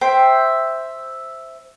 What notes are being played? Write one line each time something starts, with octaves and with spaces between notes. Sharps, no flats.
C5 E5 G5